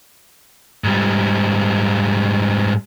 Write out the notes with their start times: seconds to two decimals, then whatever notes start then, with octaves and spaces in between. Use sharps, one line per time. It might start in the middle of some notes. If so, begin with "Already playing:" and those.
0.84 G#2 G3